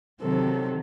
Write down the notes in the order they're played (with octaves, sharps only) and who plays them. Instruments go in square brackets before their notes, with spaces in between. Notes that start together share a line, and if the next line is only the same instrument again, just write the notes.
[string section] C3 D#3 F#3 [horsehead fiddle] C4 A4